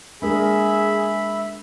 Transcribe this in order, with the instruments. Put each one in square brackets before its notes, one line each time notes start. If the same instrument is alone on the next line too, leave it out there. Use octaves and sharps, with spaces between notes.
[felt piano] G#3 [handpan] D4 A#4 [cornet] G#4 [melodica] E5 B5